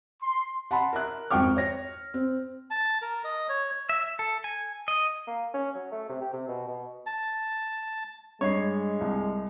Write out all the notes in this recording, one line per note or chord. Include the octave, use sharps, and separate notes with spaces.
C6
F#5 A5 B5 C6
A#4 E5 F#6
G#1 F2 C4 G5 C#6 F6
C#5 A#6
C4
A5
A#4
D#5
C#5
E5
A4
G#5
D#5
A#3
C#4
F#3
A3
C3
G4
C3
B2
B2
A5
G2 G#3 C#5 D#5 C7
C2